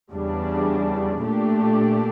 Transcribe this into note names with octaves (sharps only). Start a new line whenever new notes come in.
E2 C#3 G3 D4
A#2 A3 D4 G4